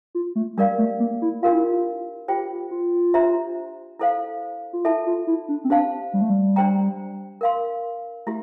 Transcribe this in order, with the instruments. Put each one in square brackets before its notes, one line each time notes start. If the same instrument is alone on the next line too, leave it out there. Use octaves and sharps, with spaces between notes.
[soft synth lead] F4
A3
[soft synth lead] G3 [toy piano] D4 G4 A#4 D5 F5
[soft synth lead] A3
A#3
E4
[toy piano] D4 G4 A#4 F5 [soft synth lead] F4
[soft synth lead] E4
F4
[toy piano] F4 C5 G5 [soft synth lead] G4
[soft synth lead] F4
[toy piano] D4 G4 C5 E5 A#5
E4 A4 C5 F5
[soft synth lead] F4
[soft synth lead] E4 [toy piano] A4 E5 A5
[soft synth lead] F4
E4
D4
C4
[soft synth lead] D4 [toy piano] G4 C5 F5 A5
[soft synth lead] G3
A3
G3
[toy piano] D4 G4 C5 G5 A#5
A#4 F5 C6
[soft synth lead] A3 [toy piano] E4 G4